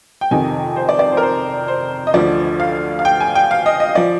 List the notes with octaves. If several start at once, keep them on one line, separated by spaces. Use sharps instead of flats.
G5
F2 C3 D#3 G#5
C5
D5
D5
C5
A#4
C5
C5
D#5
D2 D3 F3 D5
F5
F5
G5
G#5
G5
F5
D#5
D#5
F3 D5